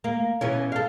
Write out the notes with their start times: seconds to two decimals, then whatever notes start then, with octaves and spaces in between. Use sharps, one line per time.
0.04 A#3
0.41 B2 E3 C#4
0.72 A4 F5